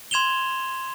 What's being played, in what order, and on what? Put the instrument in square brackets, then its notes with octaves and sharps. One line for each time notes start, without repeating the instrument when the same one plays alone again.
[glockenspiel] C6 G#6 E7 F7 G7